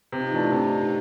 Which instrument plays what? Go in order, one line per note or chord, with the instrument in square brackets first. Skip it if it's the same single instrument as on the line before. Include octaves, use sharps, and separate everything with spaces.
[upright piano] C3 [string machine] D#4 F4
[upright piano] E3 A3 D4
C3